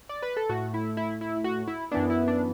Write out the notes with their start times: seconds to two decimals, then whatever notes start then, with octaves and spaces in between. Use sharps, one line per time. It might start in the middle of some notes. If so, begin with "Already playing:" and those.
0.09 D5
0.22 B4
0.37 A4
0.49 A2 A3 F#4
0.74 E4
0.97 E4
1.21 E4
1.44 F#4
1.68 E4
1.91 F#2 E3 B3 D4
2.10 E4
2.28 D4